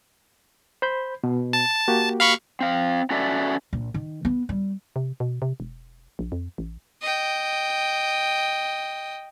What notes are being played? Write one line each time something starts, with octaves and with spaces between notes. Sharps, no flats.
C5 B5 G6
B2
A5
A#3 F#4 G4
F5 B5 C#6
C4 F5
C#4 F#4 A4 B4 D5 E5
A#1
D#3
B3
G3
C3
B2
C3
E1
A#1
F2
A1
D#5 G5